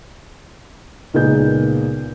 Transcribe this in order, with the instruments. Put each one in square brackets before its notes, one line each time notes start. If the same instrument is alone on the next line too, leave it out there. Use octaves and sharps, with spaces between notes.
[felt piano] C#2 A#2 B3 D#4 G#4 G6